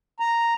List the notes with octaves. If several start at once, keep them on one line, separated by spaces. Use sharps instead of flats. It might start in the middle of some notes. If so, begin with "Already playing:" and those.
A#5